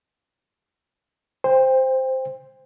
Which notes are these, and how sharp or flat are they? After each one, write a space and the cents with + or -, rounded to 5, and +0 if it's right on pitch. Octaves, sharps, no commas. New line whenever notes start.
C5 +0 G5 +25